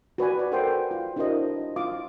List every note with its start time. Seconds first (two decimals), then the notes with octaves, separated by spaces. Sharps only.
0.18 F#4 B4 D5 G#5
0.39 D5
0.52 A4 A#4 C5 F#5 G5 C6
0.91 F4
1.16 D4 E4 F#4 A#4 C5 D#5
1.76 F4 F5 D6 D#6